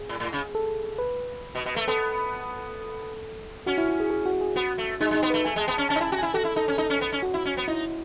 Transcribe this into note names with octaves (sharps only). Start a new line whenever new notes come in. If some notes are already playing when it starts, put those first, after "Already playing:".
Already playing: G#4
A2
A2
C#3
A4
B4
B2
B2
A3
B3 A4
C#4 F#4
E4
F#4
G#4
G#4
F#4
G#4
B3 F#4
A3
G#3 D#4
G#3
D#4
B3
A3 B4
A3 G#5
G#3
A5
B3
C#4 A5
C#4 A5
D#4
E4
A5
F#4
E4 G#5
F#4 A4
E4
D#4 A4
C#4
D#4 A4
C#4
B3
C#4
F#4
E4
C#4
B3
D#4 E4